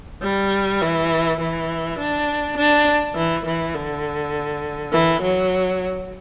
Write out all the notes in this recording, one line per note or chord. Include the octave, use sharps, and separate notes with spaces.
G3
E3
E3
D4
D4
E3
E3
D3
E3
F#3